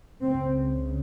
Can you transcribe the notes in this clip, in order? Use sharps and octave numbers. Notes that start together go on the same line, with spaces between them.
C#2 C#3 C4